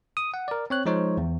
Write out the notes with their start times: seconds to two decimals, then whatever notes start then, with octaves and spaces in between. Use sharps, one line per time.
0.17 D#6
0.34 F#5
0.48 A#4 D5
0.70 C4 C#5 F#6
0.86 F3 G#3 D#4 C5 C#5
1.18 E2